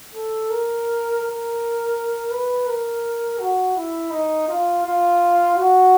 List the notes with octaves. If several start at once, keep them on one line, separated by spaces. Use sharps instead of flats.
A4
A#4
A#4
B4
A#4
F#4
E4
D#4
F4
F4
F#4